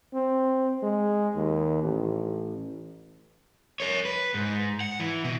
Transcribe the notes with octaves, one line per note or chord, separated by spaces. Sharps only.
C4
G#3
D#2
A1
A#4 C#5
B4
G#2
F#5
E3
B2